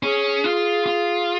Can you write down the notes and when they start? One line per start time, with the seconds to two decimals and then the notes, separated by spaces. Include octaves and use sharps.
0.03 C#4 G#4
0.44 F4
0.86 F4